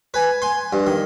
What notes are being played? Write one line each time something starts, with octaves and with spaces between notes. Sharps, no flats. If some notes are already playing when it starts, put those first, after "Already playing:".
B4 G#5
G#5 C6
G2
D#3